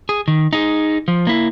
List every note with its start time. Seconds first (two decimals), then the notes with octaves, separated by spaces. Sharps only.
0.09 G#4
0.28 D#3
0.53 D#4 G#4
1.08 F3
1.27 A#3 E4